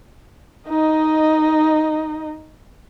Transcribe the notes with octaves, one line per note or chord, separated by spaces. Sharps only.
D#4 D#5